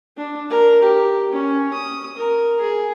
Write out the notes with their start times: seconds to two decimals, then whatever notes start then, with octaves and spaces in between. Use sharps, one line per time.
0.17 D4
0.50 A#4
0.82 G4
1.31 C#4
1.73 D#6
2.17 A#4
2.60 G#4